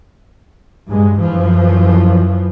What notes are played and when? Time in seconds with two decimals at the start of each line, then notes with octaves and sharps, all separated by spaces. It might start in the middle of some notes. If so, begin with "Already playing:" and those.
0.88 G2 G#3
1.19 F#2 E3 F3